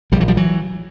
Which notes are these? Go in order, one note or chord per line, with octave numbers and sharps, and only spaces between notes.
A#1 A#2 F3 G3
E3 F#3
F3 G3
E3 F#3